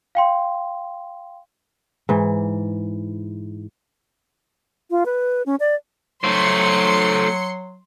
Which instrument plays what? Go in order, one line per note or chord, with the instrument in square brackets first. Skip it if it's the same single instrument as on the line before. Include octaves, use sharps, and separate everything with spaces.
[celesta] F5 G5 C6
[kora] G#2 E3
[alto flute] F4
B4
C#4
D5
[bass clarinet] F#3 [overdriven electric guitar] A3 C5 [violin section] C6 C#7